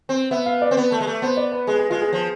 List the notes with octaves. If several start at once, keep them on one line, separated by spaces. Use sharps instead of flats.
C4
B3 E5
F5
D5
C4
B3
A3
G#3
A3
B3 C5
D5
B4
G#3 G#4
G#4
G#3 F4
G#4
F3